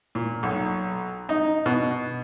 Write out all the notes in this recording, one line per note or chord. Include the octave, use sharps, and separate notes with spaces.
A#2
B1
D#4
B2